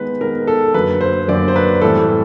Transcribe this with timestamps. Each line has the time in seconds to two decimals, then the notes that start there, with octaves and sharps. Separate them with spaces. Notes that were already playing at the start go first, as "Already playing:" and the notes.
Already playing: D#3 G#3 B3 D#4 B4
0.21 D#3 G#3 B3 D#4 A#4
0.47 A4
0.74 F#2 D3 F#3 A#3 B4
1.01 C5
1.28 F#2 D3 F#3 A#3 D5
1.48 C5
1.56 B4
1.81 A2 E3 G3 C4 A4